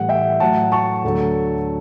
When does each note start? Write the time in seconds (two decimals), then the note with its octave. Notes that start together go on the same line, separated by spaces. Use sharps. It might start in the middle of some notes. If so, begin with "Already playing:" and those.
Already playing: A2 E3 G3 F#5
0.09 E5 G5
0.40 A2 F#3 A3 F#5 A5
0.72 A5 C#6
1.04 D2 D3 F#3 A3